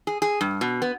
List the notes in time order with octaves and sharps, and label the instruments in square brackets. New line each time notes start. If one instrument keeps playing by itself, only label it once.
[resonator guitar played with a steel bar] G#4
G#4
G2
B2
B3